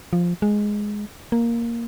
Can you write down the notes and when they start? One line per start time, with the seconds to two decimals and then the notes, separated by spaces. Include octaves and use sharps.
0.13 F3
0.42 G#3
1.32 A#3